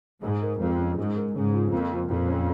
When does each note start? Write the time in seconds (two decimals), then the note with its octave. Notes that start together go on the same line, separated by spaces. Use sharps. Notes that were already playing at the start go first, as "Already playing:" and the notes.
0.23 G#2 G#3
0.42 A#4
0.60 F2 F3
0.79 C#4
0.98 G#2 G#3
1.16 A#4
1.35 G#2 C#3
1.54 F4
1.72 F2 A#3
1.92 F4
2.10 F2 A#2
2.28 C#4